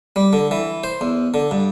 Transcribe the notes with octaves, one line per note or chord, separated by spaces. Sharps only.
G3
D3
E3
C5
E2
D3
G2